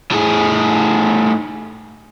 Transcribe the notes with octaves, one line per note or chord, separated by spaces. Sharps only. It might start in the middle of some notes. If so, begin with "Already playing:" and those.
A2 G#4